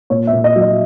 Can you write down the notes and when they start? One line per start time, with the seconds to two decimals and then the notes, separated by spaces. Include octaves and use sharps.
0.10 A#2 C#5
0.27 E5
0.33 A#2
0.44 D#5
0.56 F#3
0.61 D#5